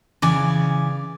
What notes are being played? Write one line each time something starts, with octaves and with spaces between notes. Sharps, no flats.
C#3 E3 D5 G#5